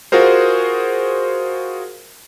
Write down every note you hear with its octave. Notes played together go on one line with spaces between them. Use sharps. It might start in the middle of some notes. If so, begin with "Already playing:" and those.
F4 F#4 G#4 A#4 C5